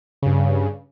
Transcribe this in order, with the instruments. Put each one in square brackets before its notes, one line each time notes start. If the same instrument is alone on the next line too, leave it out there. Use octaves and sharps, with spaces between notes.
[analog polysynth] G2 C#3